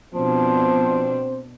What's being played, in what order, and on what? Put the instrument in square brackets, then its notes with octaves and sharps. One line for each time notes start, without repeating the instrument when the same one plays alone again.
[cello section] B2 D4 [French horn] F3 [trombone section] C4 C5